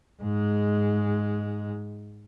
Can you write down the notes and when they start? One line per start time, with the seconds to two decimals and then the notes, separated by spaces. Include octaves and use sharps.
0.21 G#2 G#3